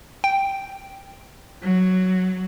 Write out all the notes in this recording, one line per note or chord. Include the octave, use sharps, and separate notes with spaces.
G5
F#3